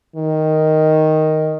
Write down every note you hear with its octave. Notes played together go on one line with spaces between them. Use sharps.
D#3